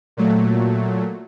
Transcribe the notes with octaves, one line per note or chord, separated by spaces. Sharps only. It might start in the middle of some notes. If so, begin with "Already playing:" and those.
A#2 F#3 A3